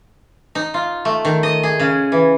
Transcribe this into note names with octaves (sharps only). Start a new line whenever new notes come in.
D#4
F4
A3
D#3
D#5
G#4
C#3
E3